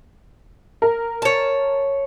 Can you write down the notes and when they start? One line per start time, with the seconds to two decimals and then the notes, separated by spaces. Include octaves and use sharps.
0.82 A#4
1.22 C#5 A5